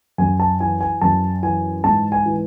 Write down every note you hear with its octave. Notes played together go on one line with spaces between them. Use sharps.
F#2 G#5
A5
E3 G#5
G#5
F#2 A5
E3 G#5
G#2 A5
G#5
E3